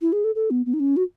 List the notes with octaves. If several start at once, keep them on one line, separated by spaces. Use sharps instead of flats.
E4
G#4
A4
A4
B3
B3
D#4
C#4
F#4